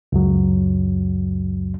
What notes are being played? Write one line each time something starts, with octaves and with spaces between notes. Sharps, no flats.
C#2 F#2 F#3